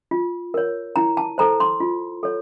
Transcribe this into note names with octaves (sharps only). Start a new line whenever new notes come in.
F4
A#4 C#5
E4 A#5
A5
A4 C5 A#5
C6
F4
A4 C#5